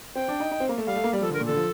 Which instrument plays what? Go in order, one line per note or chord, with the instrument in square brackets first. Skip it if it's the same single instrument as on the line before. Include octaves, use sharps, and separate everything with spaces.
[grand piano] C4 [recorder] G5
[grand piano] D4
D#4
D#4
C4
A#3
A3
[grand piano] G3 [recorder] F5
[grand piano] A3
A#3
G3
[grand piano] F3 [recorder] A4
[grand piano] D3
[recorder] A#4
[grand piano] A#2
[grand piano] D3 [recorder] A4
[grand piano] F3